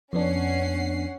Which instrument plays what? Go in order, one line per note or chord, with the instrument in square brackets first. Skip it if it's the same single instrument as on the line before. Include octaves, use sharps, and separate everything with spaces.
[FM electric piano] F2 B3 D4 [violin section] C#4 F#5 C7